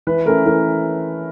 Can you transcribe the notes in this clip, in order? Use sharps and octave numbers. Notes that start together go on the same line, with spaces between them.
E3 B4
A3 C#4 E4 A#4
E3 A#4